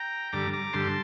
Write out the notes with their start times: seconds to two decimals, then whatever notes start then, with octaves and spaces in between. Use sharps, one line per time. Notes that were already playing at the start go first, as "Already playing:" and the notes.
Already playing: G5 A#5
0.32 G2 D3 G3 A#5 D6
0.53 A#5 D6
0.73 G2 D3 G3 A5 C6